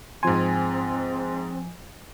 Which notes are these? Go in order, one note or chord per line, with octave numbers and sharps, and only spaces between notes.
G#2 F3 C4 G#5 C6